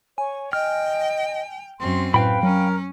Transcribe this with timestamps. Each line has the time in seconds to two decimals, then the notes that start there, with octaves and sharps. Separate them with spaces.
0.18 C#5 G#5
0.53 D#5 G5 F6
1.80 F#2 C4 C6
2.14 A2 B4 F5 G5 B5
2.43 F#3 C#4 A#4